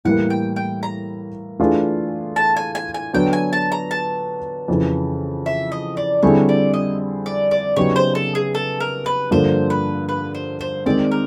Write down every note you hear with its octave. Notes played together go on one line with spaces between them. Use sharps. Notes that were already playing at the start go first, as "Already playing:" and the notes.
A2 E3 G3 A#3 F#5
G5
G5
A#5
E3 A3 D4 F4 G#4
A5
G#5
G#5
G#5
D3 F#3 B3 D4 G5
G#5
A5
A#5
A5
F2 C#3 E3
E5
D#5
D5
D3 G3 C4 E4 G#4 C#5
D5
D#5
D5
D5
C#3 F#3 B3 D#4 G4 C#5
C5
A4
G#4
A4
A#4
B4
G2 D3 F3 A#3 D4 C5
B4
B4
C5
C5
D#3 G#3 C4 D5
A#4